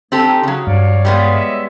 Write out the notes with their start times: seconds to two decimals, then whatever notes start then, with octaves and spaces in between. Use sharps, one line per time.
0.12 A#3 C4 G4 A4
0.26 C#4 D#4
0.43 C#3 F#3 C#4
0.67 G2 C#5 D5 F5
1.05 G3 G#3 B3
1.33 C#5 D#5 E5